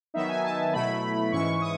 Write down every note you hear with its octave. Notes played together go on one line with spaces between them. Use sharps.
D#3 F#3 B3 D#4 E5
G#5
A5
B2 F#3 A3 E4 B5
G#2 E3 G#3 C#4 E4 C#6
D#6